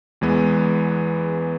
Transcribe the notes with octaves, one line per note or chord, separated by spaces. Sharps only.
E2 E3 G#3 B3